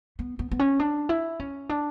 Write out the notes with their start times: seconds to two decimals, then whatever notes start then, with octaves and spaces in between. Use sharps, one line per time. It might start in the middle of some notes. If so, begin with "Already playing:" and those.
0.19 B3
0.39 B3
0.51 B3
0.59 C#4
0.79 D4
1.09 E4
1.40 C#4
1.69 D4